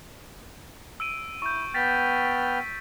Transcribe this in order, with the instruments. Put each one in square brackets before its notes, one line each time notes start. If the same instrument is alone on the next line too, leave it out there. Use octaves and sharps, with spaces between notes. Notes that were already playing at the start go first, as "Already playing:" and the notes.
[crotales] E6 D7 D#7
[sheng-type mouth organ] E4 [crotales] C#6 G6
[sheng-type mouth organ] B3 G5 F6 [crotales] A6 B6 D7